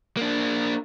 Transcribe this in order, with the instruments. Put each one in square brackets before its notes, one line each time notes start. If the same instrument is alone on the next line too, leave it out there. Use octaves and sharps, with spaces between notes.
[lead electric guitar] A#3 D4